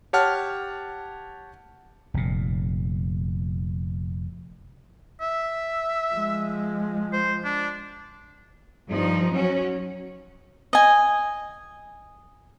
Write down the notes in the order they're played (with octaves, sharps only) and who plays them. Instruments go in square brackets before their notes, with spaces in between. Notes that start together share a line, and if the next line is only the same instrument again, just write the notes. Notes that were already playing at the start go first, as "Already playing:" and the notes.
[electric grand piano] G4 C#5 F#5 A5 F6
[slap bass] F1 A#2
[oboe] E5
[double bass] F3 G#3
[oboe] C5
D4
[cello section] G2 F3 D#4
F#3 C#4 F#4
[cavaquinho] D#5 G#5